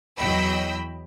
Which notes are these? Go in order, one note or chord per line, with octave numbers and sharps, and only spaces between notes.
E2 F#3 D#5 G5 B5 E6